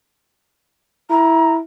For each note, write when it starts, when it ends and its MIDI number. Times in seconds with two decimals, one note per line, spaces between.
1.10 1.62 64
1.10 1.53 82